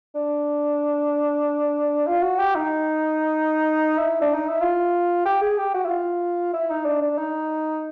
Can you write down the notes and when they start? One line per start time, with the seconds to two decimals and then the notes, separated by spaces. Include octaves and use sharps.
0.15 D4
2.07 F4
2.22 F#4
2.38 G4
2.55 D#4
3.97 E4
4.21 D4
4.34 D#4
4.48 E4
4.61 F4
5.25 G4
5.41 G#4
5.58 G4
5.74 F#4
5.85 E4
5.89 F4
6.53 E4
6.70 D#4
6.85 D4
7.01 D4
7.18 D#4